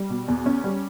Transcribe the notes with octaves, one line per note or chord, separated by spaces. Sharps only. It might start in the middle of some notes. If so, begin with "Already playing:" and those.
Already playing: G3
B2
E2
C#4
G3